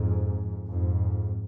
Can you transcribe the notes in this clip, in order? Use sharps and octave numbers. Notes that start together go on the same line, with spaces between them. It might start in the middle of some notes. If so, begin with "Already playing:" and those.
Already playing: F2 G#2
F2 G#2